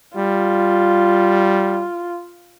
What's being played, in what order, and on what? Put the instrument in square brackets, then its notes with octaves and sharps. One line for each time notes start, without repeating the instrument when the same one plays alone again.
[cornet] G3 [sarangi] F4